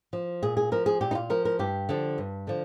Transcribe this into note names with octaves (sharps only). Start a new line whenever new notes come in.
F3
A#2 G#4
G#4
F3 A#4
G#4
A#2 G4
D#4
F4
F3 A#4
A#4
G2 G4
D3 F3
G2
D3 F3